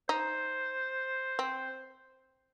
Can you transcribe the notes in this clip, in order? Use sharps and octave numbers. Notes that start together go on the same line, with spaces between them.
D#4 C5
C4